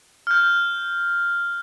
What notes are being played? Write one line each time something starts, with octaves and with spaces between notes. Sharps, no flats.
F6 G6